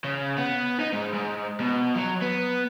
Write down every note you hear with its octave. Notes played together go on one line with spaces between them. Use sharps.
C#3
B3
D#4
G#2
G#2
B2
F#3
B3